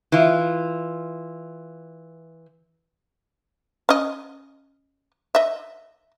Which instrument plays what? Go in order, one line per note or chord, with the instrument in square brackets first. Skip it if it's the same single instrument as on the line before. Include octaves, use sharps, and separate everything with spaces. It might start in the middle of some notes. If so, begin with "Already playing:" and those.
[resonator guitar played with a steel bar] E3 F4
[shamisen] C#4 D#5
D#5 E5